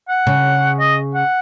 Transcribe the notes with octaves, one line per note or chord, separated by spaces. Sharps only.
F#5
C#3
D#5
F#5